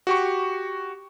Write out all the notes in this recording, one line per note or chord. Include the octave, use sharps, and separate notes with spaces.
F#4 G4 C#6